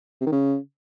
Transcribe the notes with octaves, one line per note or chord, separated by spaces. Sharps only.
C3
D#3
C#3